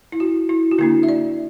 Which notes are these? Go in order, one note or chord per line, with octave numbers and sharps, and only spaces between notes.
E4
F#4
E4
F#4
D3 A#3 D4 E4
E5
D5